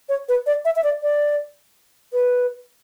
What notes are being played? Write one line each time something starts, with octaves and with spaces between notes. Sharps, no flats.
C#5
B4
D5
E5
E5
D5
D5
B4